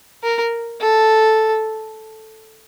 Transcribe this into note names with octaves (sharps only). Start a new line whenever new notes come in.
A#4
A4